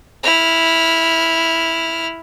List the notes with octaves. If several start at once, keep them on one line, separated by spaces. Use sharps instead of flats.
E4 F6